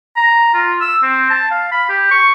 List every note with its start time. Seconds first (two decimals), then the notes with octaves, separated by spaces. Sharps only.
0.16 A#5
0.54 F4
0.81 E6
1.03 C4
1.30 A5
1.51 F5
1.72 B5
1.89 G4
2.11 C#6